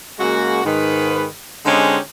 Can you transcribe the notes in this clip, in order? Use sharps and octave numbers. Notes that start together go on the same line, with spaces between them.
C#3 G#3 A#3 F#4
G#2 D#3 B4
D3 G#3 C4 C#4 D#4 G4